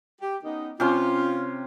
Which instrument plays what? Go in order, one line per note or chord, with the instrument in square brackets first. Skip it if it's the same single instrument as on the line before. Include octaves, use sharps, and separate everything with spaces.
[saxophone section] G4
B3 C#4 D#4
[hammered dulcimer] C3 C#4 C6 [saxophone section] F4